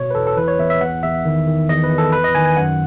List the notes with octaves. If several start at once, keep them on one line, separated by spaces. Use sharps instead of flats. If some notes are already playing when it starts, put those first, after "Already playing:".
Already playing: B2 C#5
B4
E2 A4
A4
E3 B4
C#5
E2 E5
E5
E2 F#5
E2 E5
D#3
D#3
E2 D#5
B4
E2
A4
E2 B4
D#5
D#3 G#5
G#5
F#2 F#5